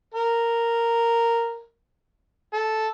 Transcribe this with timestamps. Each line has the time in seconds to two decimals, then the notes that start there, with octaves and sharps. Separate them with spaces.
0.14 A#4
2.53 A4